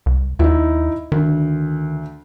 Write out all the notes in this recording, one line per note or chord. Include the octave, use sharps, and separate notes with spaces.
C2
D#2 D#4 E4
D2 D#3